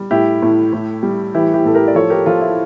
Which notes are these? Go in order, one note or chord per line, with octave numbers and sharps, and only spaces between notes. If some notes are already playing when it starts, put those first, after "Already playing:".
Already playing: G3
A2 E4 G4
A2
A2
G3
E3 E4 G4
E4 G4
A2 A4
G4 A#4
D5
F3 A4 C#5
G4 A#4
F3 F4 A4
E4